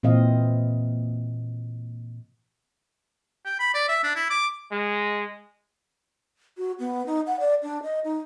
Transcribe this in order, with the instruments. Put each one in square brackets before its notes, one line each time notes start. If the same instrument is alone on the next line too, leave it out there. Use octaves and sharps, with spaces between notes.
[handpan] A#2 E3 C4 D#5 F5
[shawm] G5
B5
D5
E5
D4
E4
D6
[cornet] G#3
[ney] F#4
B3
D#4
F#5
D5
D4
D#5
D#4